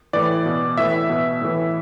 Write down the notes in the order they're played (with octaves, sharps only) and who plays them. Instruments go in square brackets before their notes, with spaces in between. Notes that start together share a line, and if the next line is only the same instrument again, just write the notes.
[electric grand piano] A2 E3 D5
B2
A2 E3 E5
B2
A2 E3